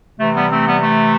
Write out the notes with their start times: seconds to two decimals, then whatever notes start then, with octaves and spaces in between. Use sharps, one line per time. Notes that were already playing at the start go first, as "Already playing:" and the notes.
0.19 C3 E3 A3
0.35 G3 B3
0.51 A3 C4
0.66 G3 B3
0.83 A3